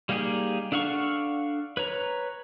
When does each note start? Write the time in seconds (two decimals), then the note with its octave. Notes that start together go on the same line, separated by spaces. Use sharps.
0.09 G3 A#3 D#4 G4 G#4
0.72 D4 A4 F5 F#5 C#6
1.77 B4 C#5 A#5